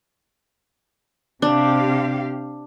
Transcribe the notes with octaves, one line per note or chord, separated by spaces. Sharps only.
C3 D4 G4 F5